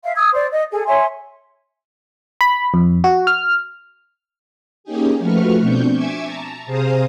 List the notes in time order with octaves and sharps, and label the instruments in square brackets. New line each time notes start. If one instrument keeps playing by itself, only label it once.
[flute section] E5 F5
D#6 E6 G#6
C5 D5
D#5
G#4 A4
C#5 E5 G#5 C6
[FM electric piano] B5
F2
F#4
F6
[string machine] A#3 C#4 D#4 G4 G#4
F3 A3 F#4 B4 C#6 F6
B2 C4 D4 C#6 G6
E5 G#5 C#6 D6 E6 G#6
A5 A#5
C3 G#4 C5 F5 A#5 D#6